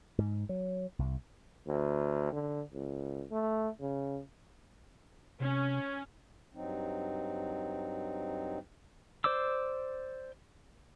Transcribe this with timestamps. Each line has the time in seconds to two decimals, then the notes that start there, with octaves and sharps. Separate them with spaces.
0.18 G#2
0.49 F#3
0.99 C2
1.67 D2
2.32 D3
2.73 C#2
3.32 A3
3.80 C#3
5.40 C3 C#4
6.54 G2 F#3 C4 D#4
9.24 C5 D5 D6 E6